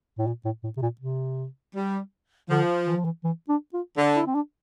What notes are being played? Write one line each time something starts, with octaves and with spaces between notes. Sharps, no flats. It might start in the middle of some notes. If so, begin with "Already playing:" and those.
A2
A#2
A2
A2
C3
A#2
C3
G3
D3 F3
E3
F3
E3
E3
D4
F4
D3
E4
C4
D4